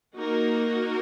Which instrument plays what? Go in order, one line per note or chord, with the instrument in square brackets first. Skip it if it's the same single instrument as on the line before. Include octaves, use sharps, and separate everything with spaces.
[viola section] A#3 D#4 F#4 A#4